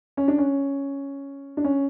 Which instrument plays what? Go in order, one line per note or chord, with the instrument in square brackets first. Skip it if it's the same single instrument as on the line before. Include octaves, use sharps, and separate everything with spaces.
[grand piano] C#4
D4
C#4
D4
C#4